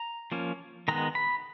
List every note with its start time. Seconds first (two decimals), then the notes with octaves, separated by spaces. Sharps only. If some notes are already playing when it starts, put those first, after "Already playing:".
Already playing: A#5
0.32 F3 A#3 C#4
0.88 D#3 G#3 B3 A#5
1.15 B5